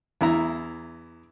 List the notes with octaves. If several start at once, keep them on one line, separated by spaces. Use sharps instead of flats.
E2 E4 A#5